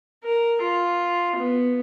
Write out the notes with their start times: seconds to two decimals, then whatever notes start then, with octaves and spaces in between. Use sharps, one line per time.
0.24 A#4
0.62 F4
1.36 B3